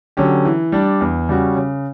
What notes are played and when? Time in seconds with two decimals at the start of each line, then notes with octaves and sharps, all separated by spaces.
0.17 D3 F#3 C#4 G4
0.45 E3
0.72 G3 D4
1.01 E2
1.29 C#3 G3 C#4 F#4
1.56 C#3